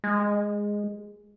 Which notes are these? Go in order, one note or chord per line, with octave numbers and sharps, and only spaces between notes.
G#3